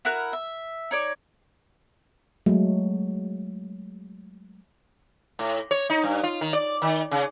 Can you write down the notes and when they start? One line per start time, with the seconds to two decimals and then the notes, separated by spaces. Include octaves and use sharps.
0.05 E4 F#4 A#4 F#6
0.33 E5
0.91 D#4 C#5 D5
2.46 F#3 G#3 A3
5.39 A2
5.71 C#5
5.90 D#4
6.04 G2
6.24 F4
6.41 D#3
6.53 D5
6.82 D#3
7.11 C#3